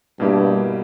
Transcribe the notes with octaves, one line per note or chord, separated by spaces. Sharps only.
G2 B2 A#3 E4 G4